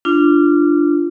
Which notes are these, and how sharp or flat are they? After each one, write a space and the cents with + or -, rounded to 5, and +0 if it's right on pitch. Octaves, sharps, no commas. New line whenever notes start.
D4 +0 F4 -25